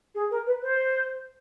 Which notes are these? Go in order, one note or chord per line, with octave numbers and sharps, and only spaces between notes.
G#4
A#4
B4
C5